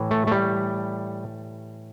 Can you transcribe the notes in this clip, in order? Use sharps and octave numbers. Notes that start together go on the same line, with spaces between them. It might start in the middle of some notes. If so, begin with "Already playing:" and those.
Already playing: A2 E3
A3
A3
G3